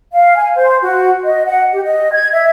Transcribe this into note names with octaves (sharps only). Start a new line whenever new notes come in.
F5
G#5
C5
F#4
D#5
F#5
G4
D#5
G#6
E5